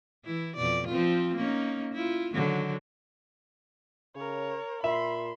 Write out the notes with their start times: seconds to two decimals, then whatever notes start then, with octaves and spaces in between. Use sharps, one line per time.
0.25 E3 E4
0.56 F2 B2 D5
0.88 F3 C4 F4
1.36 A#3 C#4 D#4
1.93 E4 F4
2.34 D3 D#3 F#3
4.16 C#3 A#4 C#5
4.84 A#2 E5 B5 C6